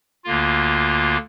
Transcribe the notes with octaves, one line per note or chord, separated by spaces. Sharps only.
D2 D3 A#3 F4